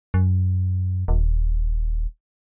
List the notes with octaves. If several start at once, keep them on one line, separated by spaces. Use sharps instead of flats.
F#2
D#1